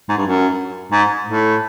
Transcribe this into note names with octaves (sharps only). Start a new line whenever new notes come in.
G#2
G2
F#2
G#2
A2